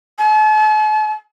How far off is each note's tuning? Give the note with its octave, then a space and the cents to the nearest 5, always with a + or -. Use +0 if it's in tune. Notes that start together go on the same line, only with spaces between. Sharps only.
A5 -45